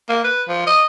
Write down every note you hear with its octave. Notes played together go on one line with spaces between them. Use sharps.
A#3
B4
F3
D#5